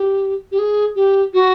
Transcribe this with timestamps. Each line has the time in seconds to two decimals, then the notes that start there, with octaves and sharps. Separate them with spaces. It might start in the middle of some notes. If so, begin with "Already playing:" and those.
Already playing: G4
0.52 G4
0.59 G#4
0.96 G4
1.34 F#4